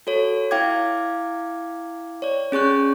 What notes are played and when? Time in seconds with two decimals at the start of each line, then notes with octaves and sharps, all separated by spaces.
0.07 F#4 A4 C#5
0.51 E4 F5 G5 D6 G#6
2.22 C#5 D5
2.52 C#4 G#4 C#6 F#6 G6